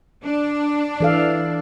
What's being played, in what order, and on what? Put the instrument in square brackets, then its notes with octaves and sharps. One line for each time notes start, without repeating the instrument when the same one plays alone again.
[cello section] D4
[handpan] E3 A4 F5